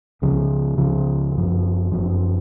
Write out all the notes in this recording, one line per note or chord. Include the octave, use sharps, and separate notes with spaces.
C#2 C#3 F3
C#2 C#3 F3
F#1 F#2 F3
F#1 F#2 F3